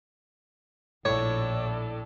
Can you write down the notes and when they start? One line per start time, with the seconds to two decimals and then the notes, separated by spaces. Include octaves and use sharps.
1.05 A#1 A2 A4 C#5 D5